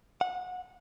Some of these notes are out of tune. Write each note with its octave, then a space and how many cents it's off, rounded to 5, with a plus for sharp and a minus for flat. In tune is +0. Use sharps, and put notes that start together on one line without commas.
F#5 -25